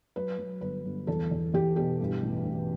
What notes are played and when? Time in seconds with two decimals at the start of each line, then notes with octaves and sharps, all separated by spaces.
0.16 F#3 B4
0.38 F#3
0.61 G1 B4
0.85 G1
1.07 E2 A4
1.31 E2
1.54 E2 G4
1.76 B2 G4
2.00 G2
2.23 A1
2.45 A1